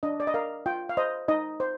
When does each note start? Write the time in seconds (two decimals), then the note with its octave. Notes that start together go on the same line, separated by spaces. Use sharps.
0.03 D4 D#5
0.20 D5
0.27 D#5
0.34 A#4 F5
0.66 F4 G5
0.89 F5
0.97 C5 D#5
1.28 D#4 D#5
1.60 C5